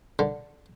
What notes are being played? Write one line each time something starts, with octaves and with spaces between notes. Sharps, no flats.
D3